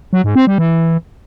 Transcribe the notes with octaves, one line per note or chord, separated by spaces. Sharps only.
F#3
G#2
C4
G3
E3